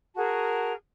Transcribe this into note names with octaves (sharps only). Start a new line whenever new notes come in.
F#4 G#4 A#4 A5